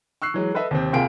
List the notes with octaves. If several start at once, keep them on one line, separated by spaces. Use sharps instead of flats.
C#6 E6 F#6 C7
E3 F#3 G#3
A4 B4 D#5 E5
D#2 C3 C4
C2 A#3 F4 G#4 G5 D7